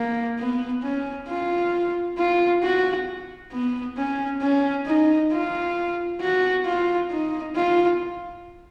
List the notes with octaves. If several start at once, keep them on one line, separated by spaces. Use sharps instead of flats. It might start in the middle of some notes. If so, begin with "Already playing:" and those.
Already playing: A#3
B3
C#4
F4
F4
F#4
B3
C#4
C#4
D#4
F4
F#4
F4
D#4
F4